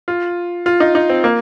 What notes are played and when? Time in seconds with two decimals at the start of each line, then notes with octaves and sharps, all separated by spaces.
0.08 F4
0.66 F4
0.80 D#4
0.95 D#4
1.10 C4
1.24 A#3